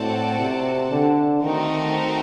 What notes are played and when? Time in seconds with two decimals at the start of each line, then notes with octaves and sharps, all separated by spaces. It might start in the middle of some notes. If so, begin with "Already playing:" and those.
Already playing: A2 C4 F#4 A4 D5 A5
0.39 C3
0.92 D3
1.44 D#3 A3 C4 D#4 F#4 A#4